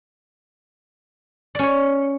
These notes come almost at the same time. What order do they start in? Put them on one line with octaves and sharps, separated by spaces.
D5 C#4 C#5